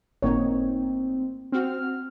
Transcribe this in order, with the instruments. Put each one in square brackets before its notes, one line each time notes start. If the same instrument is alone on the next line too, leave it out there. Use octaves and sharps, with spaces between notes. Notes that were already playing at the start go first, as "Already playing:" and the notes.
[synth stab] G1 A2 D#4 [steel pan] A#3 C#5 [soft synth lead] C4
[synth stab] C4 F#4 [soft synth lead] F6